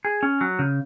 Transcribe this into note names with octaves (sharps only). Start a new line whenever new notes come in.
G#4
C#4
F#3
C#3